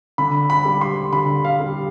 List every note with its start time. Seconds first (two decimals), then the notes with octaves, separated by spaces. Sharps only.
0.18 D3 B5
0.50 B5
0.65 G3
0.81 C6
1.13 D3 B5
1.44 F5
1.60 G3